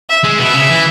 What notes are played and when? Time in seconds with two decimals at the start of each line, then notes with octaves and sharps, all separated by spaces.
0.09 E5
0.24 G#3
0.39 B2 E5
0.54 C#3
0.70 E3